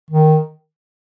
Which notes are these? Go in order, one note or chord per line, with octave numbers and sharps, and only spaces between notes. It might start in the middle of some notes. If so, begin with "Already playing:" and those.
D#3